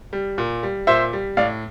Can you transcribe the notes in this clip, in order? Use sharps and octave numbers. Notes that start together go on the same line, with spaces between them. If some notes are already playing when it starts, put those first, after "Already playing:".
G3
A#2
G3
A#2 C5 E5
G3
A2 D5 F5